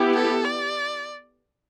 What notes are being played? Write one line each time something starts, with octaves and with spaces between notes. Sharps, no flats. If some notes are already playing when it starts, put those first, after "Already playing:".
Already playing: B3 E4 G4
A4
D5